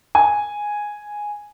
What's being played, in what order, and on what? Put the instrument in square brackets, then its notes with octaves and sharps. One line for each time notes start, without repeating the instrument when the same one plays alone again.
[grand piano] G#5